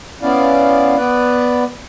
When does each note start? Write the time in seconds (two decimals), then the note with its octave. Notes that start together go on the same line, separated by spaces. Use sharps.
0.22 B3 C#4 E4 D5 F5
0.97 B3 B4 D5